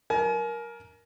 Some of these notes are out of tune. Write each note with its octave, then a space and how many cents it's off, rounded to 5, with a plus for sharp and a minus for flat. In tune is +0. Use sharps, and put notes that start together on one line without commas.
A#4 +10 G#5 +40